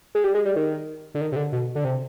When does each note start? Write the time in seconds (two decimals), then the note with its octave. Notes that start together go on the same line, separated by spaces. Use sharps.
0.15 G#3
0.24 G3
0.34 G#3
0.45 G3
0.56 D#3
1.15 D3
1.21 D#3
1.32 C3
1.36 D3
1.52 B2
1.75 D3
1.84 C3